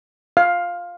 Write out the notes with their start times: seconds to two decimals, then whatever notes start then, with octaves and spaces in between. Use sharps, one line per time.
0.37 F5